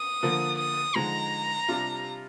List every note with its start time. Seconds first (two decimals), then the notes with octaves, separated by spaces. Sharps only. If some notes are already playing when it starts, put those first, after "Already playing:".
Already playing: D#6
0.23 D3 F3 A#3
0.58 D#6
0.95 D3 F3 G#3 D#4 A#5
1.69 C3 G3 D4 F4